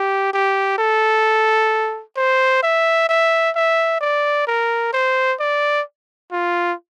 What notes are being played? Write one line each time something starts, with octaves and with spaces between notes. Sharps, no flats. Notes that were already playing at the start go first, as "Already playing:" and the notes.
Already playing: G4
G4
A4
C5
E5
E5
E5
D5
A#4
C5
D5
F4